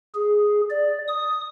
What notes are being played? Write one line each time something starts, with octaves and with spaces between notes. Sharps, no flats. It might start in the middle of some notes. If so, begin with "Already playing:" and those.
G#4
D5
D#6